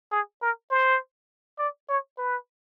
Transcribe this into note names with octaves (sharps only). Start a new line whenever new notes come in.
G#4
A#4
C5
D5
C#5
B4